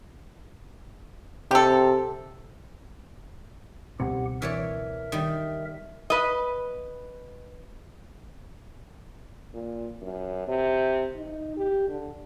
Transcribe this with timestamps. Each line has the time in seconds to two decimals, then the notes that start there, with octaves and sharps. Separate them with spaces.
1.51 C3 G4 A4
4.00 C#2 B2 C4 G4 F#5
4.42 E3 A#4 C#5 D5 E5
5.12 D#3 G3
6.10 B4 D#5
9.54 A#2
10.02 F#2
10.48 C3
11.16 D#4
11.57 G4
11.89 D3